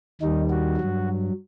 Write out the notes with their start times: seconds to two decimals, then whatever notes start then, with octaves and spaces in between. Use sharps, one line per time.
0.21 D#2 D#3 G3 D#4
0.50 F#4
0.77 G2 F#3